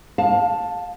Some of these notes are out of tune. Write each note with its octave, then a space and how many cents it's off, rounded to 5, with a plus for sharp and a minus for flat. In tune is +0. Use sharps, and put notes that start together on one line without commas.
F5 +30 A5 +0